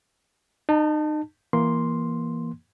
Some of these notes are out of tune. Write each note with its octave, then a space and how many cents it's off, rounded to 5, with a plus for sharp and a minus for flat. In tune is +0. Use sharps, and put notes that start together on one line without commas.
D#4 -30 A5 +15
E3 +10 A#3 +10 C6 +0